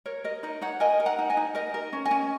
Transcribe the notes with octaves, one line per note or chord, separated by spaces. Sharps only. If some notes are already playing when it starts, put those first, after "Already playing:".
A#4 C#5
A#4 D#5
D#4 D#5
D#4 C#5 F#5
A#4 D#5 G#5
A#4
F#5 A#5
D#4
D#5 G#5
D#4
A#4 D#5
A#4
C#4
D#5 G#5
C#4